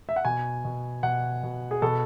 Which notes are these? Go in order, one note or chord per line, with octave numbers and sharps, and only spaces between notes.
E5
F#5
B2 G#5
B2
B2 F#5
B2
G#4
B2 A4